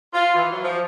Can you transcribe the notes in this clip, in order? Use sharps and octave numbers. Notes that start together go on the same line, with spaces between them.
F4
E3
F#3
F3